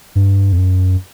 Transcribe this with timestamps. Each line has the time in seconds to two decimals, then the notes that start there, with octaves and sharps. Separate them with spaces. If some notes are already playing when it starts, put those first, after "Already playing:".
0.15 G2
0.53 F2
0.58 F#2